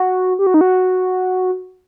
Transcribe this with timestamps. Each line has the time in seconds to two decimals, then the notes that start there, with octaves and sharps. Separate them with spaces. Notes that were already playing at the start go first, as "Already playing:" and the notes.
Already playing: F#4
0.39 G4
0.47 F#4
0.54 D#4
0.61 F#4